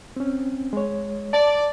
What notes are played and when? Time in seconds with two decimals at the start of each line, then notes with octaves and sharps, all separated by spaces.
0.16 C4 C#4
0.73 G#3 C#5
1.33 D5 A5